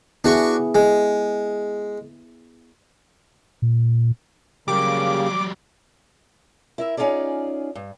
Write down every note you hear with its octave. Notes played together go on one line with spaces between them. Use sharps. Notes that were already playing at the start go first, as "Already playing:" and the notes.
B3 D4 E4 F#4 G#4 C#6
G#3
A#2
C#3 F#3 G3 A#3 G4 D6
E4 A#4 E5
C#4 D#4 F4 G#4 D5
G2